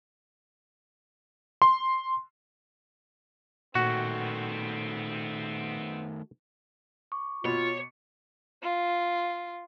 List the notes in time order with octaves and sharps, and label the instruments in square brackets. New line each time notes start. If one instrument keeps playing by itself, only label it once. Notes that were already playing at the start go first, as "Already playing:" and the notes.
[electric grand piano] C6
[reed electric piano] A#2 [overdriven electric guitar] D#3 A3 [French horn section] B3 C4 [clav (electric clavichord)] F#4
[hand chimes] C#6 D6
[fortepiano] B2 [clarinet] F4 [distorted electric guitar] C#5
[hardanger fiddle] F4